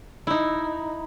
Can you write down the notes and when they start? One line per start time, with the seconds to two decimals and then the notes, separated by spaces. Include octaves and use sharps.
0.27 D#4 E4